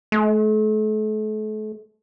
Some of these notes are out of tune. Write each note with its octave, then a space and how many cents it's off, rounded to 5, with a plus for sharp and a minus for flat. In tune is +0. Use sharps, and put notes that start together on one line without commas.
A3 -40